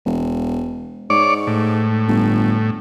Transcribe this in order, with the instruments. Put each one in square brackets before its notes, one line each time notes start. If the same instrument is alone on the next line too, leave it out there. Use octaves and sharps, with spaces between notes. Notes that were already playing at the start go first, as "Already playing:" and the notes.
[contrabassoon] E1
[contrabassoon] G#2 [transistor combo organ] C#5 D5 D6
[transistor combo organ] A2
[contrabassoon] G1